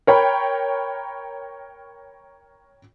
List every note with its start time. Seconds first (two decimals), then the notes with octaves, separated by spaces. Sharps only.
0.07 A#4 C#5 G5 B5